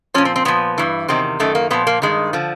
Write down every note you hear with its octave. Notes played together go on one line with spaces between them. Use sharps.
A#2 F3 C#4
C4
C4
A#2 F3 B3
G2 E3
E2 C3 D#3 C4
F#2 D#3 A3
A#3
A#2 F3 B3
A#3
G2 D#3 G#3
D3 F3